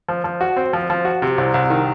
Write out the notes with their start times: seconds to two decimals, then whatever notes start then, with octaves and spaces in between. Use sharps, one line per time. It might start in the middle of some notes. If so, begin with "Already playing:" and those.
0.09 F3
0.24 F3
0.41 F#4
0.56 C4
0.73 F3
0.90 F3
1.05 F#4
1.22 C3
1.38 C2
1.54 C2
1.70 D#3